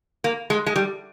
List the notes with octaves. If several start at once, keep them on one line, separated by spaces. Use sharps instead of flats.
A#3
G#3
G#3
G3